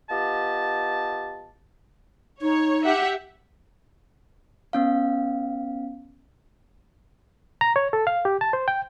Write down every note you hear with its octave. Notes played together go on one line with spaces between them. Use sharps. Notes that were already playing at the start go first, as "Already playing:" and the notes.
B3 F4 G4 D#5 A5
D#4 C#5
G4 E5 F#5
B3 C#4 F5
A#5
C#5
A4
F5
G4
A5
C5
G5